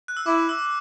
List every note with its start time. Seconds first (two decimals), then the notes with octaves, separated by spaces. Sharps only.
0.08 F#6
0.17 E6
0.26 E4 D6
0.49 E6